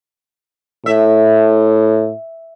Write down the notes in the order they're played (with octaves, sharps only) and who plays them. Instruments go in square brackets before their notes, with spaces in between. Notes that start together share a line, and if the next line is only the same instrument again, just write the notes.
[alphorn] A2 [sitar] E5